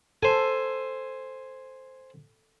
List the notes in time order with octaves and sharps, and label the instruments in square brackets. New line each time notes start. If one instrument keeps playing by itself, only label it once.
[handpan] A4 [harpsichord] C5 G#5